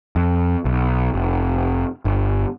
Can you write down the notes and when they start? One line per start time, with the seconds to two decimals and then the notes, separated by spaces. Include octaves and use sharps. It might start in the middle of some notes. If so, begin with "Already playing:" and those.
0.16 F2
0.65 B1
1.14 F1
2.05 G1